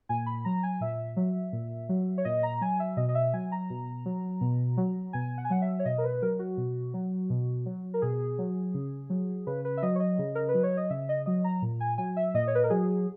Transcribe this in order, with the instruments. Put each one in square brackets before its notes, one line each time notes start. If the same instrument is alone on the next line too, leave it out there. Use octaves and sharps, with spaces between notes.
[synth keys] A#2 G#5
B5
F#3 A#5
G#5
A#2 E5
F#3
A#2
F#3
C#5
A#2 D#5
A#5
F#3 G#5
E5
B2 D#5
D#5
E5
F#3 G#5
A#5
B2
F#3
B2
F#3
B2 G#5
F#5
G#5
F#3 F#5
E5
C#5
B2 D#5
A#4
B4
F#3 A#4
F#4
B2
F#3
B2
F#3
A#4
B2 G#4
F#3
C#3
F#3
C#3 B4
B4
E5
F#3 D#5
C#5
D#5
C#3
A#4
B4
F#3
C#5
D#5
C#3 E5
D#5
F#3 D#5
A#5
A#2
G#5
F#3 G#5
E5
A#2 D#5
C#5
B4
A#4
F#3 G#4